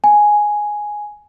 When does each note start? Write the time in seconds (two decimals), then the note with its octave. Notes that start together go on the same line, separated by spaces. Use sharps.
0.04 G#5